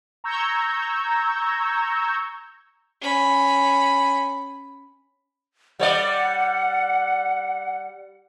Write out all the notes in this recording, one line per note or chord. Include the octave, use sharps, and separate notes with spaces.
A#5 C#6 E6 G6 G#6
C#4 B5
G3 C#5 D5 F#5